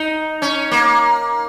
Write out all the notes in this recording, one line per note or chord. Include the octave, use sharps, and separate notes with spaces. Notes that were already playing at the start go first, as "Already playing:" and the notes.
Already playing: D#4
C#4
A#3